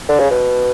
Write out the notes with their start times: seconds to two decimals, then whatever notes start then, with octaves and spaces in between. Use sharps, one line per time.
0.09 D3
0.19 C#3
0.30 B2